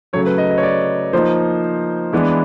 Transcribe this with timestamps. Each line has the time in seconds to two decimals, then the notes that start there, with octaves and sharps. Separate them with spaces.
0.13 C#3 F#3 A3 C#5
0.26 B4
0.38 D#5
0.51 D#5
0.58 C#5
0.63 D5
1.13 F3 A#3 D#4 C5
2.13 E3 G#3 B3 D4